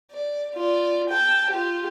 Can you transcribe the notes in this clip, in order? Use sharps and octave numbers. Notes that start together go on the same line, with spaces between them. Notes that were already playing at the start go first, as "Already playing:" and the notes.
D5
F4 D5
G5 A5
F4 G4